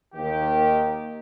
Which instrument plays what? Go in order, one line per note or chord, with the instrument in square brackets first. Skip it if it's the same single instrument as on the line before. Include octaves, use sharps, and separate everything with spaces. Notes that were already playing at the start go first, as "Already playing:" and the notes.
[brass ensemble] D#2 D#3 G4